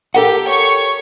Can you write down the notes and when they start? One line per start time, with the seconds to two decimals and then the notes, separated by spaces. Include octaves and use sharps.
0.15 G4 A4 A#4 F#5
0.47 C#5 C#6